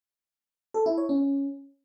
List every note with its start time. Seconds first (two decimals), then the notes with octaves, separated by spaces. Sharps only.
0.74 A4
0.86 E4
0.98 C#5
1.09 C#4